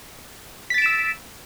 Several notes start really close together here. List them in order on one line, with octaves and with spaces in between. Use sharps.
B6 A6 D7 E7 E6